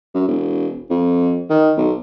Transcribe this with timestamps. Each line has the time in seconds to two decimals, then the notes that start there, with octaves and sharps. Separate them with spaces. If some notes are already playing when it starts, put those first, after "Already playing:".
0.14 F#2
0.28 E1
0.90 F2
1.50 D#3
1.77 B1